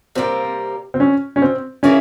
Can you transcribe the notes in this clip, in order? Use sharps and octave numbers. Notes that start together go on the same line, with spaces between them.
C3 G3 A#3 C4
C4
C#4
C#4
C4
E3 A#3 C#4 E4 G#4